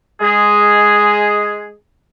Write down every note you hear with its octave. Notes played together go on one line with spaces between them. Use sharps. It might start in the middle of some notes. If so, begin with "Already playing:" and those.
G#3 G#4